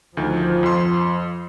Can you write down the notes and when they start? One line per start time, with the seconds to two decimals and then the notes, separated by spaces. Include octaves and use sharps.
0.17 D2 D#3 F3
0.63 F2 C6